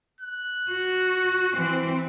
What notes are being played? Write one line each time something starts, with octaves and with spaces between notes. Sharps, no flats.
F#6
F#4
E3 C4